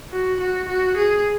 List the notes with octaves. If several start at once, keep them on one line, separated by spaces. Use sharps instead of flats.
F#4
F#4
F#4
G#4